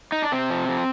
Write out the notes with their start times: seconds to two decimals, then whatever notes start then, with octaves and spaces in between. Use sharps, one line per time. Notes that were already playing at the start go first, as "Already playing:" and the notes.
0.12 D#4
0.22 D4
0.32 C3 C4
0.50 F3
0.69 F3